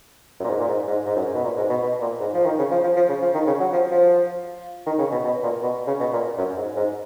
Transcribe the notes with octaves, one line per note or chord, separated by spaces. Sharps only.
F#2
A#2
G#2
A#2
G#2
G#2
G#2
F#2
G#2
B2
A#2
G#2
B2
B2
A#2
G#2
F3
D#3
C#3
F3
F3
F3
C#3
F3
D#3
C#3
F#3
F3
F3
D#3
C#3
B2
B2
A#2
B2
C#3
B2
A#2
F#2
G#2
G#2